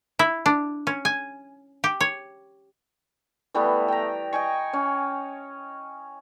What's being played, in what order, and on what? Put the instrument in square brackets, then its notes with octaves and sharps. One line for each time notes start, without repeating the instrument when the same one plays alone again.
[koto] E4
D4
C#4
G#5
G4
C#5
[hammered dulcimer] E3 G3 A3 B3
G5 A#5
D#5 G5 G#5 C#6
C#4